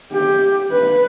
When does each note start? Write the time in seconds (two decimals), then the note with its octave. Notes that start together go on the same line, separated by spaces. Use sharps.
0.13 G4
0.71 B4